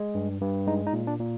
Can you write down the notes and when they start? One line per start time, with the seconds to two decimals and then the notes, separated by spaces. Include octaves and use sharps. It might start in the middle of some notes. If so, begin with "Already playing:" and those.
Already playing: G#3
0.15 G2
0.41 G2
0.67 G#3 D#4
0.87 D#4
0.93 A#2
1.07 D4
1.19 A#2